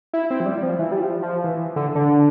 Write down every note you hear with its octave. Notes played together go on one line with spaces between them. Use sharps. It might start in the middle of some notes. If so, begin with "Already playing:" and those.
E4
C4
F3
G3
G3
F3
E3
G3
F3
F3
E3
D3
D3